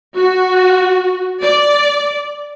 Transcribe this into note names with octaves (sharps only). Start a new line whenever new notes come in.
F#4
D5